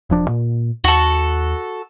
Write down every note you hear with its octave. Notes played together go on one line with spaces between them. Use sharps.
E1 F3 D4
A#2
D#2 F#4 A4